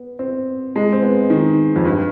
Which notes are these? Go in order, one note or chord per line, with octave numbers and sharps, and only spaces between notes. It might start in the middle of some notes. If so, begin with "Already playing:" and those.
Already playing: B3
C4
G#3
C4
B3
D#3
F2
G2